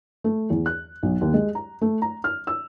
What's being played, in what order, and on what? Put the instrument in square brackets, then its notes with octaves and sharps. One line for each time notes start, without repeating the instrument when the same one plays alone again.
[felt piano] A3
E2
F#6
B1
D#2
G#3
A#5
A3
A#5
F6
E6